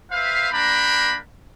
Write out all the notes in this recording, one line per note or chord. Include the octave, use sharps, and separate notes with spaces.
B4 C5 E5 F5
A#3 D4 A#4 G5 A#5 B5